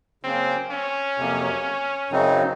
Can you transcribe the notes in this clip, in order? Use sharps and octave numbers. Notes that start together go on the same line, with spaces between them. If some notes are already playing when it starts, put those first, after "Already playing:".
C#3 F#3 A#3 C4 C#4
C#4
F2 C3 F#3 A#3
F#2 C#3 F#3 C4 D#4